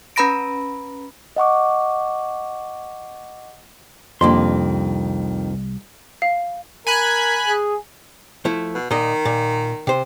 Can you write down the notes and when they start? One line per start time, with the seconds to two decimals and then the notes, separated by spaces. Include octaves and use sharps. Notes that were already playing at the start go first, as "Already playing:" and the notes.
0.16 C#4 B4 A#5 B5 A#6 D7
1.36 D#5 F#5 C#6 D6
4.21 C2 F2 D#3 A#3 D4 C6
6.22 F5
6.87 A#4 G#5 B5 F#6
7.47 G#4
8.45 F3 A3 E4
8.75 B2
8.91 A#2 D#3 D#5
9.25 A#2
9.87 C3 C5